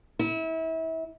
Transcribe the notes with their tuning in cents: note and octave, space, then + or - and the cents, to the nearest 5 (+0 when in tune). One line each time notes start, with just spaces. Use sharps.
E4 -30